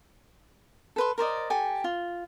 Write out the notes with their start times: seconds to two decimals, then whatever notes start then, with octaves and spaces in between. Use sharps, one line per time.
0.96 A4 B4 C6
1.18 A#4 C5 D5 D#5
1.50 G4 A4 G#5
1.84 F4